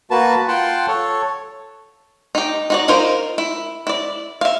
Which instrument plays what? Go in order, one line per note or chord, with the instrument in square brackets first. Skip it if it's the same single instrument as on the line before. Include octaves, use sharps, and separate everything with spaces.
[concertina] A#3 F#4 B4 A5
F4 F#5 G5 A5 C6
A4 C#5
[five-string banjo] D#4 G4
D#4 F#4 D5
D#4 F4 A#4 C5
E4
E4 D5
E5 F5